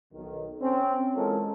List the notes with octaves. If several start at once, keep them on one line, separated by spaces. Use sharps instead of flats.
B1 D#3
C4 C#4
E3 G#3 C#4 F4 A4 A#4